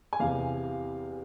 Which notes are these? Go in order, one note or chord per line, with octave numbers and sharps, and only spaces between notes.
G#5
E2 C3 E3 F5